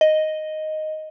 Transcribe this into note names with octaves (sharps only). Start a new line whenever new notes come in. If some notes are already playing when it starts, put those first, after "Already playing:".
D#5